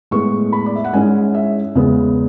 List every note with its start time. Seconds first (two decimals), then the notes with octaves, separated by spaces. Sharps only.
0.11 A2 G#3 B3 C#6
0.53 B5
0.66 D5
0.76 E5
0.84 F#5
0.93 G#2 G#3 C#4 E4 G#5
1.35 E5
1.75 E2 C#3 G#3 B3